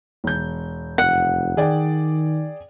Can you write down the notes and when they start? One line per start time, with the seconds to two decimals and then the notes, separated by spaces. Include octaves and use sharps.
0.24 E1 G6
0.98 F1 F#5
1.57 D#3 G#4 D5 G5